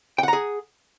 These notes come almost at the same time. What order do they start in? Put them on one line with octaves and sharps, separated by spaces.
G5 F#5 A#5 G#4